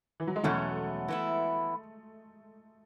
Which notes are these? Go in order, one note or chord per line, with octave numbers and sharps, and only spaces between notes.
E3
F#3
G#3
E2 B2 F#3 A3 C#4 F#4
E3 B3 E4